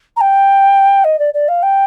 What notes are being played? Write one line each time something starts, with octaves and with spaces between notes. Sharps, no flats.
A#5
G5
D#5
D5
D5
F5
G5